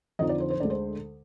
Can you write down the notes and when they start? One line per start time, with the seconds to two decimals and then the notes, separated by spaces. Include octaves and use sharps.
0.19 F2 D3 F3 C4 D#4 D#5
0.29 D5
0.40 C5
0.50 C5
0.60 D2 D3 G#3 D5
0.70 C5